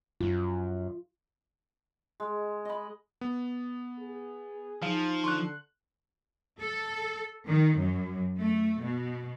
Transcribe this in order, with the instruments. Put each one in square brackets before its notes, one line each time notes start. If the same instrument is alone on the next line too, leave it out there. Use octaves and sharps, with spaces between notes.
[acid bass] F#2 [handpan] F4
[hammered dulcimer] G#3
D#5 B5
[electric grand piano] B3
[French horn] G#4
[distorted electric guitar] F3 [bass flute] D#4 [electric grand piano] F5
[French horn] D3 [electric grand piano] C6 C#6 F#6
[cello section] A4
D#3
F#2
A3
B2